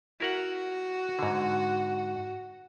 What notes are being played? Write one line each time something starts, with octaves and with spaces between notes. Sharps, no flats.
E4 F#4 A#4 F#5
G#2 D3